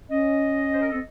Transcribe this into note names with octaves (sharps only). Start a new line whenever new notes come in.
C#4 D#5
C5
A#4
C4 A4